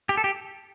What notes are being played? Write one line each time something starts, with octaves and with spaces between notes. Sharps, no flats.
G4
A4
G4